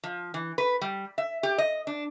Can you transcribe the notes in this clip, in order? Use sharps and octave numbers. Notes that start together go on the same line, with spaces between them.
F3
E3
B4
G3
E5
G4
D#5
D4